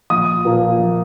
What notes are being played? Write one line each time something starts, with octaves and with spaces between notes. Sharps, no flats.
A#1 D#6
A#2 F3 A#3
A#1